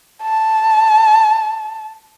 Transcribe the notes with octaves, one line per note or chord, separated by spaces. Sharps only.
A5